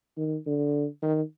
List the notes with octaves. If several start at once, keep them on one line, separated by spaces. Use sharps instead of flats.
D#3
D3
D#3